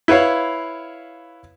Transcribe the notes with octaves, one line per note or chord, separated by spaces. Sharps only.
E4 B4 C#5 F5